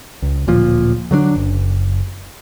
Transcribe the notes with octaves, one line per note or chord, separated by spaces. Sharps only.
C#2
D1 A#2 F3
D3 F#3 G#3 D4
F#1